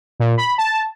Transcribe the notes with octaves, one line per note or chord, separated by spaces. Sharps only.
A#2
B5
A5